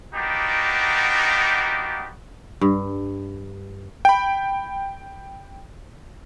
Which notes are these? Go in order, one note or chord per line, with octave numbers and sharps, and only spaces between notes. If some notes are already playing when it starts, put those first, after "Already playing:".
A#3 B3 D4 D#4 F#4 G4
G2
G5 B5